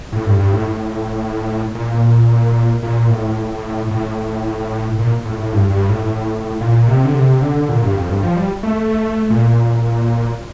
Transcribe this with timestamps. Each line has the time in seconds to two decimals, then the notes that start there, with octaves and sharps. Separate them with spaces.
0.12 A2
0.26 G2
0.39 G2
0.53 A2
1.75 A#2
2.83 A#2
3.09 A2
3.91 A2
4.99 A#2
5.25 A2
5.39 A2
5.53 G2
5.70 G2
5.89 A2
6.61 A#2
6.88 C3
7.05 D3
7.15 C3
7.42 D3
7.69 A#2
7.82 G2
7.96 F2
8.09 G2
8.23 F3
8.36 G3
8.63 A3
9.30 A#2